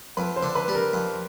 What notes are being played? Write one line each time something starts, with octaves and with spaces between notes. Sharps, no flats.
F2 B4
C5
D3
B4
G3
A#4
F2